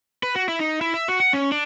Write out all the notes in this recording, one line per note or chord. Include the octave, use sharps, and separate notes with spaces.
B4
F#4
E4
D#4
E4
E5
F#4
F#5
C#4
D4